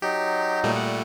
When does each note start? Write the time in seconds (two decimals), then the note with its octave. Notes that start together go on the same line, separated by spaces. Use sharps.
0.02 F#3 D#4 G4
0.63 A#2 G3 A3
0.76 F#5